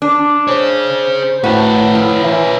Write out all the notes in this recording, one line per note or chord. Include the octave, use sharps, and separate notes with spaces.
D4
G#4 C5 C#5
A2 C#4 F#4 B4
F3 E4
E3